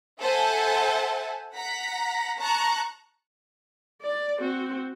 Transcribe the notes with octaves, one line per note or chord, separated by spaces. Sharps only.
A4 C5 E5 F#5 G#5 A5
F#5 A#5 B6
A5 A#5 C#6 F#6
D5
C4 F#4